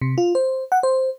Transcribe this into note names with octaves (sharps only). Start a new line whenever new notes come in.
C3
F4
C5
F#5
C5